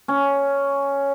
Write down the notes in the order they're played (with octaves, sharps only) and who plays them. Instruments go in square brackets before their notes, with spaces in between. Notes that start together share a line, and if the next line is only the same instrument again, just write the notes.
[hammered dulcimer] C#4